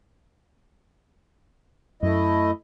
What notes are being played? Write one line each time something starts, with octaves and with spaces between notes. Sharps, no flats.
F#2 A3 E4 D#5